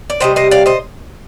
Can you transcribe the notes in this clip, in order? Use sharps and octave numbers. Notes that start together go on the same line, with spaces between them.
D5
C3 G3 C5 D#5
C5 D#5
D5 F5
C5 D#5